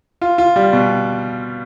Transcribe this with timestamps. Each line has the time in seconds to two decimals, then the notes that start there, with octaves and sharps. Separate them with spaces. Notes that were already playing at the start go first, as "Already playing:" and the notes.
0.21 F4
0.38 F4
0.56 G3
0.73 B2